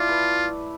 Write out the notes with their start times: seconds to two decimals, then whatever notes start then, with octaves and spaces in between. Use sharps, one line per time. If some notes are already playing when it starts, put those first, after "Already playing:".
Already playing: A3 E4 F4 D5
0.09 B4